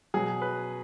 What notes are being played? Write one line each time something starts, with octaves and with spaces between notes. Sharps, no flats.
B2 F#3 G#4
B4